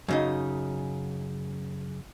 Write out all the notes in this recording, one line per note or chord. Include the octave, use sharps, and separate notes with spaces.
F#2 C#3 D#4